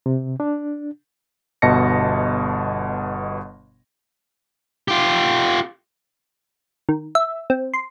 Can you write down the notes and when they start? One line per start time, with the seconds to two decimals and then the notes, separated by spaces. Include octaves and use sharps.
0.06 C3
0.40 D4
1.62 G1 B2 D#5 A5 A#6 C#7
4.88 F4 G4
6.89 D#3
7.15 E5
7.50 C4
7.74 C6